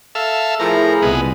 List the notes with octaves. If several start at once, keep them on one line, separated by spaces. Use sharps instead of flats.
A4 E5 F5
A2 F3 E4 G#4 A#4
C2 G#3 B3